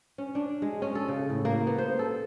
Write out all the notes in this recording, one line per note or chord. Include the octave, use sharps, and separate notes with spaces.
C#4
D4
G#3
C#4
A4
C#3
A2
A#3
B3
C5
A4